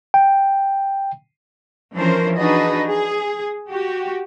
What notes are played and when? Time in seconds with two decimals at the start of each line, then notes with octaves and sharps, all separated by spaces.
0.14 G5
1.95 E3 F3 C#4 D4 A#4 C5
2.38 D4 D#4 F#4 G#4 B4 D#5
2.87 G#4
3.69 F#4 G4